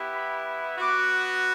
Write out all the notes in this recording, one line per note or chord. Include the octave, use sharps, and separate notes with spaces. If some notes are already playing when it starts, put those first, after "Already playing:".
Already playing: B3 E4 G4
B5
B3 F#4 D6